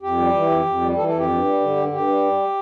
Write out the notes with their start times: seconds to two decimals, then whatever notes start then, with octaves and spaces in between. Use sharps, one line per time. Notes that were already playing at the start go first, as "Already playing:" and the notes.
0.02 F2 G4
0.18 G3
0.34 E3
0.50 F2
0.66 F2
0.81 G3
0.97 E3 A4
1.08 A4
1.12 F2
1.18 G4
1.28 G2
1.45 G3
1.60 D3
1.76 G2
1.92 G2 G4
2.07 G3